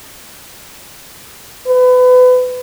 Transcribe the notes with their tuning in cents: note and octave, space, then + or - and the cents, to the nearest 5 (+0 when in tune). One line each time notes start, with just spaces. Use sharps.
B4 +30